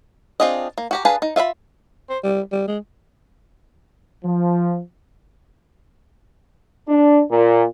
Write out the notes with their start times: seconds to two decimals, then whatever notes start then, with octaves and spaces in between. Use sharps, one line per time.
0.40 C4 D4 F4 G#4 D#5
0.78 A#3
0.91 F#4 G4 A#5
1.05 D4 G#4 B4 F5 A5
1.22 D#4
1.36 F4 E5 A5 B5
2.10 C5
2.24 G3
2.52 G3
2.68 G#3
4.24 F3
6.89 D4
7.32 A#2